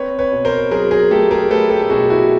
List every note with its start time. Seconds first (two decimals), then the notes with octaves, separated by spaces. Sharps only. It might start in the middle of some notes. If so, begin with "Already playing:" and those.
Already playing: C4 B4 C#5
0.19 B4 C#5
0.32 B2
0.45 A#4 C5
0.71 F#3 G#4 A#4
0.91 G#4 A#4
1.11 A3 G4 A4
1.31 G#4 A#4
1.50 A3 A4 B4
1.70 G4 A4
1.83 A4
1.90 B2 F#4 G#4
2.10 E4 F#4